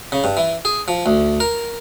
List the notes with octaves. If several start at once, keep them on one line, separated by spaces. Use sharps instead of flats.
C#3
G2
E3
G#4
F3
D2
A#4